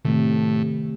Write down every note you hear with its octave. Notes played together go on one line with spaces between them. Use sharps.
A2 C3 D#3 A3